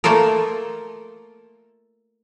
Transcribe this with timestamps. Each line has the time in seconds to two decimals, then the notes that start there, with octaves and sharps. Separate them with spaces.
0.04 A3 A#3 F4 A4 A#4